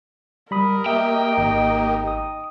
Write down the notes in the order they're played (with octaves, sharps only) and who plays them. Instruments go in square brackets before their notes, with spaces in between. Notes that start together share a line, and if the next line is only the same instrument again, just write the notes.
[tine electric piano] G3 B5 D#6 [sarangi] A#4
[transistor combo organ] A#3 G4 D#5 [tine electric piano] E5 [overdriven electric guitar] G5
[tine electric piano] G#1 [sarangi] D#4
[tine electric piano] D#6